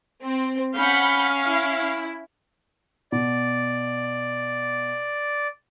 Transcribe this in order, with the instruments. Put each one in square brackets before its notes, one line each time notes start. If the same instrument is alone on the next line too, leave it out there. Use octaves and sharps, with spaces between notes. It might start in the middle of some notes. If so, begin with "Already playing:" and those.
[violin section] C4
[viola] C#4 F5 [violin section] F#5 B5 G6
[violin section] E4
[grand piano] B2 [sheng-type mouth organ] D5